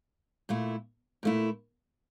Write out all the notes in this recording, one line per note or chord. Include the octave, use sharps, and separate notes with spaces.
A#2 A3 E4
A#2 A3 E4